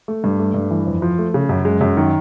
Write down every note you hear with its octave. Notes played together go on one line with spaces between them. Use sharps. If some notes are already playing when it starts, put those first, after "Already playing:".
A3
G2
A3
G2
E3
F2
F3
A3
C#3
F#2
G#3
F#2
D#3